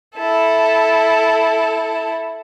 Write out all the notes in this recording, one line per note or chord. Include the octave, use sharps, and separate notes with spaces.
E4 A4